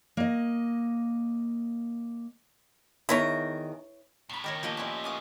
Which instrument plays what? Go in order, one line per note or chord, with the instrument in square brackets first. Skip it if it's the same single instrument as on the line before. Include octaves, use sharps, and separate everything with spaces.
[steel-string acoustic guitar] A#3 D#5
[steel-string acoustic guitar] E2 D#3 A#5 [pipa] E4 B4 C#5
[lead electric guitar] E2 A2 [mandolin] B5 C6
[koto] D#3 A#4 C#5 [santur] G5 [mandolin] D6
[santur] F3 [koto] A#3 G4 D#5 [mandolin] D#4 G5
[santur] C#4 C5 D#5 [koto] E4 G4 [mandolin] B4 D5
[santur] C#4 [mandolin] F5 D6 D#6